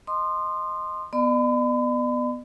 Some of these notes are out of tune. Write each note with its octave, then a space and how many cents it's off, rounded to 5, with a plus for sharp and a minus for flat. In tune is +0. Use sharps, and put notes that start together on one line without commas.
D#5 +0 C6 +0 D#6 -35
B3 +0 D5 +45 B5 +40